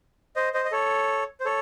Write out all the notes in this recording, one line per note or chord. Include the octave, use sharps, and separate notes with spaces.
C5 D#5
C5 D#5
D#5
A4 C#5
C5
A4 C#5